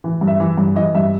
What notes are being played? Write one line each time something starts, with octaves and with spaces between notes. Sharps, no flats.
E3
G2
E5
E3
G2
E3 D#5
G2 E5